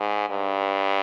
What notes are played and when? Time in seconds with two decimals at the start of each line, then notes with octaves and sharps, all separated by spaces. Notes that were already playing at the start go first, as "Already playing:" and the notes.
Already playing: G#2
0.29 G2